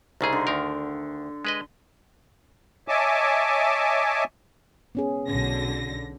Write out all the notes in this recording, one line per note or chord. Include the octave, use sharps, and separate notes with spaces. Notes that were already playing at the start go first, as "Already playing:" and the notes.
C2 C#3 D#4 G#4 A4 C6
D3
D2 D#3 A#4
G#3 B4 D#5
C#5 D#5 E5 G#5 A5 D6
B3 C#4 G#4
B1 D3 C#4 A#6